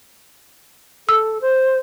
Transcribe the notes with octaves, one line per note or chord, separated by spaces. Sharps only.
A4 E6
C5